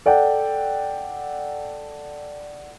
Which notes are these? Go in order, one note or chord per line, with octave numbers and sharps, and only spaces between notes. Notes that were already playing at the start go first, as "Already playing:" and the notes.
A4 D5 F#5 G5